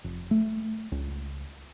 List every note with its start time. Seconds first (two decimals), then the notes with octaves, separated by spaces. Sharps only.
0.04 F1
0.31 A3
0.92 C#2